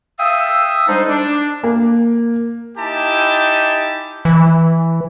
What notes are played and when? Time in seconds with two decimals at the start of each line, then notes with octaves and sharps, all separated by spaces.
0.19 E5 F5 G5 D#6 E6
0.88 G3 G#3 D4 D#4 A4 C5
1.08 D4
1.64 A#3
2.78 D#4 E4 G4 G#5 A5
4.25 E3